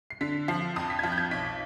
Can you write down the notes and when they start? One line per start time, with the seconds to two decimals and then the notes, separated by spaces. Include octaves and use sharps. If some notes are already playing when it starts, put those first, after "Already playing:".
0.10 C7
0.21 D3 B6
0.48 F3 C7
0.76 F2 D#6
0.90 B6
0.99 G#6
1.03 F3 B6
1.12 G6
1.18 G#6
1.31 B1 B6